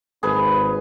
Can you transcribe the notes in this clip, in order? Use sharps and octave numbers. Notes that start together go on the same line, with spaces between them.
G#1 G#4 B4